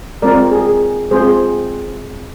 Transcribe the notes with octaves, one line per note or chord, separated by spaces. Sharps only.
G#3 C4 F4 A#4 D5
G#4
G#3 C4 F4 G#4 C5